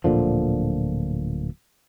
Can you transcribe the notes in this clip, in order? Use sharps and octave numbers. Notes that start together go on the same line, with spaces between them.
D1 A#2 D3 F3